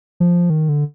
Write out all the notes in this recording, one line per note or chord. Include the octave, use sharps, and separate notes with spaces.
F3
D#3
D3